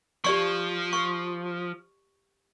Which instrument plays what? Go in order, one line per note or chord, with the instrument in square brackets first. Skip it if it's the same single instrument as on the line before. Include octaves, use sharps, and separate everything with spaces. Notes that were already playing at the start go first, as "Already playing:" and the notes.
[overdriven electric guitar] F3 [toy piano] G4 D5 C#6
[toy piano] C#6